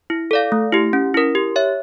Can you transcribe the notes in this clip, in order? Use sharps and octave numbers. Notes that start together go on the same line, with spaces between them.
E4
A4 D5 F5
A3
E4 G4
C#4
E4 A#4
G4
C#5 E5